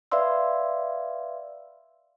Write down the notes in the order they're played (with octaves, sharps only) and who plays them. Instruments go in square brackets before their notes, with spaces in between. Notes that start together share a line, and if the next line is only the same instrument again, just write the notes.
[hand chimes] B4 D5 E5 F5 C6 E6